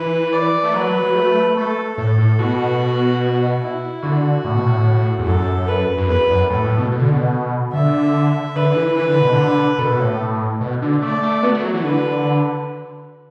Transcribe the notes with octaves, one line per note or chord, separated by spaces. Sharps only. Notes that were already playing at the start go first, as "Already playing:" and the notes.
Already playing: E3 B4
D5
A3
F#3 B4
F#3
A3
A3 A4
A2 A4
A2
B2 F#4
E4
D3 F#4
A2
B2
A2
E2
F#2 A4
B4
F#2
E2 B4
F#2
A2 A4
A2
B2
B2
D3
B2
D3 E5
D3 B4
D3
E3
E3 B4
D3
B2
D3
B2 A4
B2
A2
B2
D3
A3 D5
A3
B3 F#4
A3
F#3
E3
D3 B4